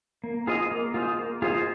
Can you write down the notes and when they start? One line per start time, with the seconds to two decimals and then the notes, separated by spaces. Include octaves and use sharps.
0.24 A#3
0.47 F4 G#4 C5 D#5
0.71 A#3
0.94 F4 G#4 C5 D#5
1.19 A#3
1.42 F4 G#4 C5 D#5